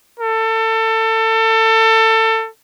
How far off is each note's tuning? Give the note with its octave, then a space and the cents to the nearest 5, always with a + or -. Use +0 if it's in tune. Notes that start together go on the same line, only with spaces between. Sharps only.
A4 +25